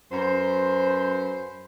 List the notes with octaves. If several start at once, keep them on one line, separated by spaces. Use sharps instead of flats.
F#2 B4 C5